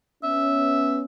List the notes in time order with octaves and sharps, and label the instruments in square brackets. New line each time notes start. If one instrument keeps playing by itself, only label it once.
[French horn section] B3 C#4 [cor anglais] E5